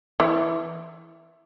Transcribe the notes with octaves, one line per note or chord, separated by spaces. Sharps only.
E3